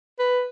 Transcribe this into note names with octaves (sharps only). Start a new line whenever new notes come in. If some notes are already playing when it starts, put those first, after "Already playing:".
B4